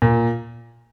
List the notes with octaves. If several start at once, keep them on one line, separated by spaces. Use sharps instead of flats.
A#2